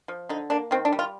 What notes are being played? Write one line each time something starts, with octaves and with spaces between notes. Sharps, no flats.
F3
D3 D#4
A#3 D4
D#3 C4
D4
G3
F4